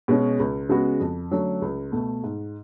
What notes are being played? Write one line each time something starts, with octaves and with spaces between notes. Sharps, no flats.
B2 G#3 C#4
C#2
C#3 G#3 B3 F#4
F2
D3 F#3 A3 C#4
C#2
B2 A3
G#2